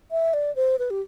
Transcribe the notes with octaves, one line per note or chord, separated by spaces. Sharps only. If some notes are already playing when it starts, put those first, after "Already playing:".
E5
D5
C5
B4
G4